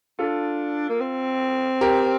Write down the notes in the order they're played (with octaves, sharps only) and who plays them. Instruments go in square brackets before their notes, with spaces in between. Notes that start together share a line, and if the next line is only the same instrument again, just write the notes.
[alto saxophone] D4 [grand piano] F4 A4
[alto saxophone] A#3
C4
[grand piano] G4 A#4